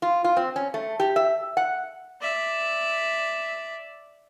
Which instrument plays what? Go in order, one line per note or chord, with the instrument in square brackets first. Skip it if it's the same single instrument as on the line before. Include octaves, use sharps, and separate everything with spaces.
[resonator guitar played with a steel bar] F4
F4
C4
C#4
A3
G4
E5
F#5
[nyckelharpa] D5 E5